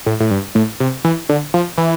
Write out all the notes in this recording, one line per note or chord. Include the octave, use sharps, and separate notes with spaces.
A2
A2
G2
A2
C3
E3
D3
F3
E3